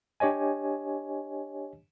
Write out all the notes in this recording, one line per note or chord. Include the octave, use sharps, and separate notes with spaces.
D4 G4 C#5 D#5 G#5